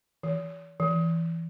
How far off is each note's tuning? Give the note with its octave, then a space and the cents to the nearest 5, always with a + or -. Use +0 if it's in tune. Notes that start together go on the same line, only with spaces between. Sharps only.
E3 -10
E3 +10